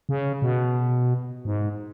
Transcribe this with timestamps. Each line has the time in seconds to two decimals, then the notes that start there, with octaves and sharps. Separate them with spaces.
0.09 C#3
0.42 B2
1.45 G#2